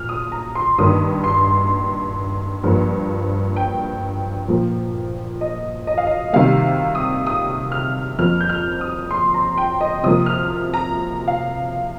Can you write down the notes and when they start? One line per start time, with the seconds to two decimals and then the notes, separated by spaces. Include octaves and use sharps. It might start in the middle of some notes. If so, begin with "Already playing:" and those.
Already playing: A#2 F6
0.09 D#6
0.32 A#5
0.55 C6
0.78 G2 D#3 A#3 D#6
1.24 C6
2.63 G2 F3 A#3
3.56 G5
4.48 A#2 F3 A#3
5.41 D#5
5.87 D#5
5.98 F5
6.07 D#5
6.33 C3 D#3 G3 A#3 F5
6.95 D#6
7.27 D#6
7.72 F6
8.19 F2 F3 A#3 F6
8.41 G6
8.49 F6
8.81 D#6
9.11 C6
9.34 A#5
9.58 G5
9.81 D#5
10.04 C3 F3 A#3 D#6
10.26 F6
10.74 A#5
11.28 F5